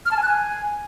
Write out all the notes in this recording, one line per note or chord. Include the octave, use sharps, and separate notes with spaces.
F6
A5
G#5
F#6
G#5